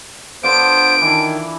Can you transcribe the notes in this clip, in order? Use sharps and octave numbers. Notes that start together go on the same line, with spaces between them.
D3 B3 F4 C5 D6 D7
D#3 E3 D4